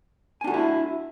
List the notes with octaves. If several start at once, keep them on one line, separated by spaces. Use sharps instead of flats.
D4 E4 F#4 A4 G#5